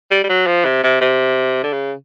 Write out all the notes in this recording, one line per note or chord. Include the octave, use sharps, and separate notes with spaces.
G3
G3
F#3
F3
C3
C3
C3
D3
C#3